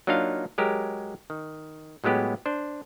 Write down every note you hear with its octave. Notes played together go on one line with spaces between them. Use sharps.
F#3 A#3 D4 D#4 F4 F5
F#3 G#3 G4 A#4
D#3
A2 F#3 G#3 B3 G4
D4 C5